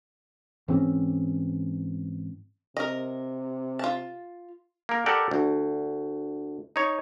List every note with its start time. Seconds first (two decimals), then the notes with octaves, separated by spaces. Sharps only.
0.68 G#2 E3 C4 C#4
2.77 C3 A#4 D#5
3.79 F4 A5
4.89 A#3 A#4
5.06 G4 A4 A#4 D5 F#5
5.31 D2
6.76 D#4 C#5